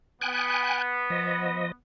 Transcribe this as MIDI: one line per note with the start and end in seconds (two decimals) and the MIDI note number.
0.21 1.74 59
0.21 0.82 79
0.21 0.82 80
0.21 0.82 90
1.10 1.72 53
1.10 1.72 75